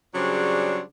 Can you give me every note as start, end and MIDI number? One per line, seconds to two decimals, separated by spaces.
0.14 0.81 49
0.14 0.81 54
0.14 0.81 55
0.14 0.81 62
0.14 0.81 68
0.14 0.81 72